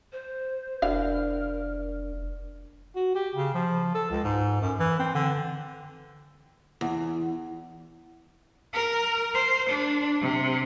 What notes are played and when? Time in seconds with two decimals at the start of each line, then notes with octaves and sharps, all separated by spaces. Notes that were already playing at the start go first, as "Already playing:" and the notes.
0.12 C5
0.82 F1 E3 D4 F#4 A#4 D5 F5
2.96 F#4
3.15 G4
3.35 C#3
3.54 F3
3.94 A4
4.10 C#2
4.24 G#2
4.61 F#2
4.79 E3
4.99 C4
5.14 D3
6.81 E2
8.73 A#4
9.34 C5
9.70 D4
10.21 C3